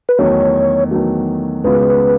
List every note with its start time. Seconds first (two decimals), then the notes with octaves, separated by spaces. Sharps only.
0.09 B4
0.19 E2 D#3 F#3 A3 C#5
0.91 E2 D#3 F#3 A3
1.64 C#2 C#3 G#3 B3 F#4 B4